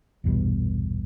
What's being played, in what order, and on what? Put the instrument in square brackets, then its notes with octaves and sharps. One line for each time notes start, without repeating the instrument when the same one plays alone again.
[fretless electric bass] A#1 E2 G2 B2